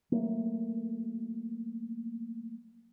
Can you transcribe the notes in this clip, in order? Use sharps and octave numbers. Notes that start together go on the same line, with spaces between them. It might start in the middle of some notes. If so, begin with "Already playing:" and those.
F#3 A3 A#3